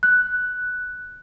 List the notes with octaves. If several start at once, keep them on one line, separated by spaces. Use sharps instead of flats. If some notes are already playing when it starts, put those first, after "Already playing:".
F#6